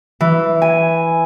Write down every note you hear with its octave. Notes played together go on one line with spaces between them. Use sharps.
E3
G#5